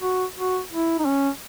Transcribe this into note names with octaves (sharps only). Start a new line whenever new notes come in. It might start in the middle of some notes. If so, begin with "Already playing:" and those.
F#4
F#4
E4
D#4
C#4